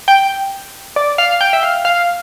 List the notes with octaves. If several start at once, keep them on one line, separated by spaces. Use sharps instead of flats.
G5
D5
F5
G5
E5
F5
F5